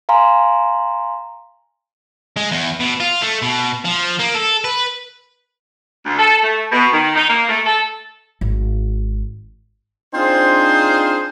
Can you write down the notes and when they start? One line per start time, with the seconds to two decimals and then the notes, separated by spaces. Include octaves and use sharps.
0.09 F5 G#5 A#5 C6
2.36 G#3
2.51 E2
2.80 B2
3.00 F4
3.22 A3
3.42 B2
3.85 F3
4.20 A#3
4.35 A4
4.65 B4
6.06 D2
6.19 A4
6.44 A3
6.72 B2
6.92 D#3
7.15 D#4
7.29 A#3
7.49 A3
7.65 A4
8.41 G#1
10.14 C4 D4 D#4 F4 G#4 C5